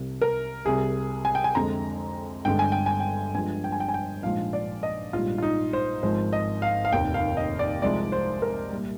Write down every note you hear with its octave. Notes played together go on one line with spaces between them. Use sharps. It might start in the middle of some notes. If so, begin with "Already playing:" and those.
Already playing: C2 C3 G3
A#4
C2 C3 G3 G#4
G#5
G5
G#5
F2 D3 G#3 A#5
G1 G2 D3 G#3 G5
G#5
G5
G#5
G5
G1 G2 F3 G#3 G#5
G5
G#5
G5
G#5
G5
A#1 G#2 F3 G#3 F5
D5
D#5
A#1 G#2 G3 F4
F4
D#4
C5
G#1 G#2 F3 G#3 C5
D#5
F5
F5
F1 D#2 D#3 G5
F5
D#5
D5
C2 C3 F3 G#3 D5
C5
A#4
A#2 G3